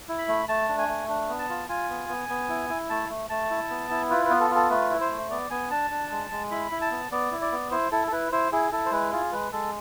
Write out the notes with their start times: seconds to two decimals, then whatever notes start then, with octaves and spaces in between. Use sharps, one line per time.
0.09 E4
0.18 B5
0.28 A3
0.48 A3 A5
0.68 D4
0.79 G#5
0.88 A3
1.09 D4
1.29 B3
1.39 A5
1.49 F4
1.69 F4 G#5
1.90 B3
2.09 B3
2.29 B3
2.49 E4
2.70 E4
2.90 A3 A5
3.09 A3
3.30 A3 A5
3.50 E4
3.70 B3
3.90 E4
4.10 F4 B4
4.25 B4
4.30 B3
4.40 A4
4.50 F4
4.55 A4
4.70 A3 B4
4.90 E4
5.00 C5
5.10 A3
5.30 B3 D5
5.50 B3 G#5
5.71 D4 A5
5.91 D4
6.11 G#3
6.31 G#3
6.51 E4 B5
6.71 E4
6.81 A5
6.91 B3
7.11 B3 D5
7.32 E4
7.42 D5
7.52 B3
7.71 E4 C5
7.92 E4 A4
8.07 A4
8.12 E4 B4
8.32 E4 C5
8.52 E4 G#4
8.72 E4 A4
8.86 C5
8.92 G#3 B4
9.12 F4 G#4
9.32 G#3 B4
9.52 G#3 A4